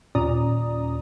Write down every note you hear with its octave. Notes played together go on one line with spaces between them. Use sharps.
D#2 A#2 C#4 D5 A#5 D#6